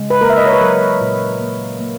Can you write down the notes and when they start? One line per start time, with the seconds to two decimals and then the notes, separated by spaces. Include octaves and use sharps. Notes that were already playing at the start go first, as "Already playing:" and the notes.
Already playing: C#3 G#3
0.10 B4
0.21 A#3 A#4
0.30 E5
0.37 D#5
0.46 C#5
0.53 B4
0.61 F#3 A#4
1.01 A#2
1.41 A#3
1.80 A#3